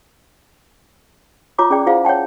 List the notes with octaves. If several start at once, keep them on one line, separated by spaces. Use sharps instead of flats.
F4 C#5 A#5 D6 D#6
C#4 G#4 D5 G5
E4 F4 G#4 C5 F5 F#5
C#5 F#5 G5 A5